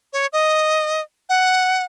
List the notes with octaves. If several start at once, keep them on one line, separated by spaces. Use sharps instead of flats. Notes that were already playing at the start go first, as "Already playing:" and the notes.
C#5
D#5
F#5